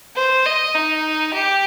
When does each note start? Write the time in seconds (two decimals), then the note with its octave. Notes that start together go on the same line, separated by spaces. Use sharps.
0.16 C5
0.46 D#5
0.75 D#4
1.33 G4